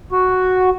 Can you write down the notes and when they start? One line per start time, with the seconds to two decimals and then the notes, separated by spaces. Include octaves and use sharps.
0.12 F#4